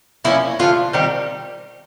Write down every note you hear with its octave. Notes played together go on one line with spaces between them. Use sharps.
F3 A#3 C#4 E4
D3 F3 A3 F4
D#3 G3 C4 D#4 G4